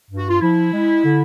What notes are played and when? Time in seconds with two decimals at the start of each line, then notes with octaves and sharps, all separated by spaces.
0.10 G2
0.17 F#4
0.29 F4
0.41 F3 E4
0.73 G#3
1.04 D3